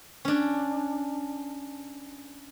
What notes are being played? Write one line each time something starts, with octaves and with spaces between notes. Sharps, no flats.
C#4 D4